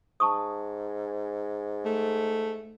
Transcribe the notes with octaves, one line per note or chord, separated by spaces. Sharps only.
G#2 A5 C#6 D#6
A3